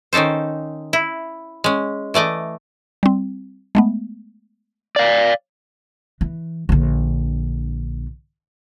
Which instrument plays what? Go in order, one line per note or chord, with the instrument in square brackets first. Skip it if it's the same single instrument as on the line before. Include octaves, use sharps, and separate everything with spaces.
[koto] D#3 C#4 D#4 A4 C5
E4
G#3 C#4
E3 A3 D5 D#5
[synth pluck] G3 C4
G#3 A3 B3
[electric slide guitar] D5 F5
[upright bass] E3
A#1 D3